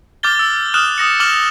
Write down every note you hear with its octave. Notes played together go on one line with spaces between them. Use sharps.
D6 F6 G6 A6 G7
E6
D#6 F6 F#6 E7 G7
D#6 A#6 C#7
D6 F6 E7 F#7